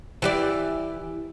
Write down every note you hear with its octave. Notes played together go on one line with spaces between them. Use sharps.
E3 G4 D5